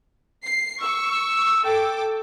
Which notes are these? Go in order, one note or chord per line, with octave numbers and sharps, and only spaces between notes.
C7
C#6 E6
E6
A4 G5 D6